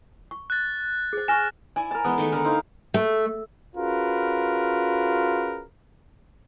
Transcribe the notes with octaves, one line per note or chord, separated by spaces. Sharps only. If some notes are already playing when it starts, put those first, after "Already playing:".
C#6
F#6 A6
G#4 C5
G#5 C#6 F6 A#6 E7
E4 D5 G#5
A#4 A5
E3 G#3 B3
D#3 G#3 A3
D3 A#4
D#4 E4 C5 F5
A3
C#4 F4 F#4 G#4 A#4 B4